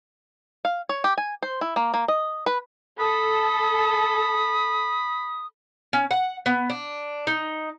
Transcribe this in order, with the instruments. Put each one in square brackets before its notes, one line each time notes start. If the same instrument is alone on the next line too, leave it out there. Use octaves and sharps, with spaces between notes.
[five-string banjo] F5
C#5
G4
G#5
C5
E4
A#3
A#3
D#5
B4
[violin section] A4 [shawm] B5 [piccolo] D#6
[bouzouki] C#4
F#5
B3
D4
D#4